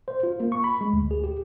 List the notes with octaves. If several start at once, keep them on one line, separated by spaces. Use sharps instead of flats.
C5
F4
A#3
C#6
B5
G#3
D2
G#4
G4